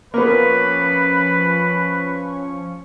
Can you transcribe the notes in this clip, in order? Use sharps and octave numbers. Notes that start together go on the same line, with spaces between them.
F3 A#3 B3 C#4 B4 C#6